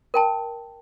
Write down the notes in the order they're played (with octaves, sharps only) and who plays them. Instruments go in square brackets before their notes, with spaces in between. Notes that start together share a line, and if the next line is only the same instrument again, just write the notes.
[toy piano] A#4 G5 A5